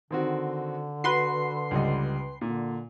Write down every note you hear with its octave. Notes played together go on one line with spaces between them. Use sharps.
D3 D#3 C4 F#4
F#4 B4 C6 C7
C#2 G3 D#5
A#2 D3